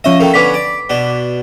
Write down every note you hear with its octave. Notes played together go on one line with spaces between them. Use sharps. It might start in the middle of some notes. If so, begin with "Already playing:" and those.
F3 C#4 D#5 E5
D#3 A3 A#3
D3 B3 C#4 B4 D6 B6
D5
B2 D4